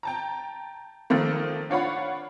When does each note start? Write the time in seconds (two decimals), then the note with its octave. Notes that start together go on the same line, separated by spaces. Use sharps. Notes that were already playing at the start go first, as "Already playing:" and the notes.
0.03 G5 A5 A#5
1.10 D#3 F3 A3 A#3
1.70 D4 F4 C#5 F#5 B5